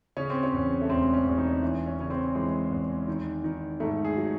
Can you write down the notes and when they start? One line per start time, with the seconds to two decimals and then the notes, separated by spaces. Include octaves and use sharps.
0.17 C#3 C#4
0.30 C4
0.43 C#4
0.53 E2
0.81 A3
0.90 E1 C4
1.14 C#4
1.26 E2
1.38 D#4
1.62 E3
1.86 C#4
1.99 C#3 C#4
2.10 C4
2.35 E3 G#3
2.71 E2
3.08 D#3
3.44 D#3
3.80 G#2 A3
4.05 G#4
4.17 F#3